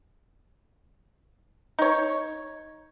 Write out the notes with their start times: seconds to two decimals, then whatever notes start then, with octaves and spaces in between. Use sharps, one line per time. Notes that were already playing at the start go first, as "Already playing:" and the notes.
1.79 D#4 C#5